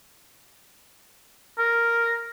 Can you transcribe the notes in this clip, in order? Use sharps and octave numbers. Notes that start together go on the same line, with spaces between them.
A#4